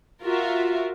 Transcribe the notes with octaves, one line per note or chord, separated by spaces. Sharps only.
F4 F#4 A#4 E5